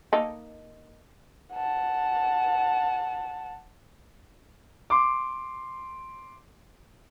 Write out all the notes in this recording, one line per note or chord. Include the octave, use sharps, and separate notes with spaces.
A#3 D#4 A4
F#5 A5
C6 D6